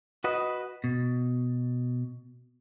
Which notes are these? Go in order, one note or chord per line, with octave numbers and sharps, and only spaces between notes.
F#4 B4 D#5
B2